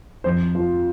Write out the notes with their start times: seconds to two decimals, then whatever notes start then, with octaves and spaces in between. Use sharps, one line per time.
0.24 F2 C5
0.55 F3